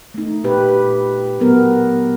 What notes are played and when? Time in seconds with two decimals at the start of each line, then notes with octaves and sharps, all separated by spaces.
0.14 A3 D#4
0.44 A#2 G4 B4
1.40 F#3 B3 A#4